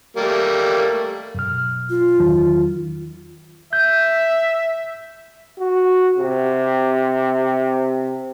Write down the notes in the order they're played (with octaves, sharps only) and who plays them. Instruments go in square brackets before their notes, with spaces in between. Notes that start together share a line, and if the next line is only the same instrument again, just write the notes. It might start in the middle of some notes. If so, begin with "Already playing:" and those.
[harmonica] G3 A3 A#3
[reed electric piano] F#2 B2 F6
[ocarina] F4
[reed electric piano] E2 D#3 F#3
[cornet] E5 [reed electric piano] G6
[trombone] F#4
C3